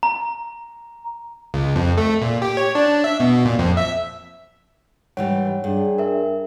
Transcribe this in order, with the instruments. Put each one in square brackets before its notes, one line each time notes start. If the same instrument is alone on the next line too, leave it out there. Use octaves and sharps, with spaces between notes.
[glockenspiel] A#5
[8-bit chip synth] C#2
F2
A3
A#2
G4
C#5
D4
E5
B2
A#2
F2
E5
[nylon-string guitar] G#2 E3 G3 [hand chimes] C#5 F#5
[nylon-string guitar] G2 [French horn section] D4 G#4
[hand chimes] A#4 E5